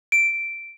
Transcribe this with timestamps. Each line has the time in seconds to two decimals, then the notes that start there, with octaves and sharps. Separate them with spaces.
0.12 D7